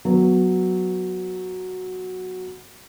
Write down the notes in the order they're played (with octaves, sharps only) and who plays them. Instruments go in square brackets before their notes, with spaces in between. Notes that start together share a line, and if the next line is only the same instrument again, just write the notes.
[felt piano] F#3 B3